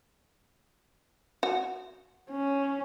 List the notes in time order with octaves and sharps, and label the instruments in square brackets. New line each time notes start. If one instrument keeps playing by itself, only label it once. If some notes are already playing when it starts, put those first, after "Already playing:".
[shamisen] F#4
[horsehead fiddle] C#4